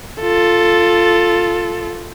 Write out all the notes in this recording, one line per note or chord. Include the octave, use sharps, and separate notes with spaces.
F4 A4